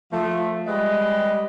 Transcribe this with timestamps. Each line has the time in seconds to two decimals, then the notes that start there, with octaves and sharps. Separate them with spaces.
0.12 F3 A3
0.67 G3 G#3 B4 D5 D#5